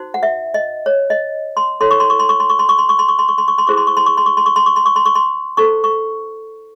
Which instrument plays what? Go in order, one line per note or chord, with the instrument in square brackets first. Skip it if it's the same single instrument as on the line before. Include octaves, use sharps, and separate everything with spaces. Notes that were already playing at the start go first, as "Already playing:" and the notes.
Already playing: [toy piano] D#4 F#4 C5
F#5
E5
D#5
C#5
D#5
C6
E4 A4 C#5 C6
C#6
C6
C#6
C6
C#6
C6
C#6
C6
C#6
C6
C#6
C6
C#6
C6
C#6
C6
C#6
C6
E4 G#4 C5 C#6
C6
C#6
C6
C#6
C6
C#6
C6
C#6
C6
C#6
C6
C#6
C6
C#6
C6
D#4 A4 C5 C#6
C#6